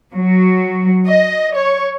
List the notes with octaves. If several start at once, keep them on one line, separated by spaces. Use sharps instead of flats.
F#3
D#5
C#5